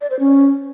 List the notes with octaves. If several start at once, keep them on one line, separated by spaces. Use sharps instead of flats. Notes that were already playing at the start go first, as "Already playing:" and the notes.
D5
C5
C#4